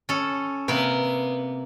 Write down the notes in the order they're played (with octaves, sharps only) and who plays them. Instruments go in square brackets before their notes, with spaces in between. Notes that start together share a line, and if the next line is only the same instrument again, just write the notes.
[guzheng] C#4 A4
[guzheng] C3 A#3 [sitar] B3